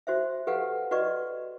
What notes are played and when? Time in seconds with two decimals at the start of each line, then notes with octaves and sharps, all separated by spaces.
0.07 F#4 C5 E5
0.47 G4 A4 B4 F5 F#5
0.91 F#4 B4 D5 D#5 C#6